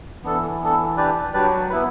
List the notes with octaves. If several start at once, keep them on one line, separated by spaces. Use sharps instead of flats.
E3 B3 D4 A4
B3 D4 A4
D4 G4 B4 D5
F#3 D4 G4 B4 D5
B3 E4 B4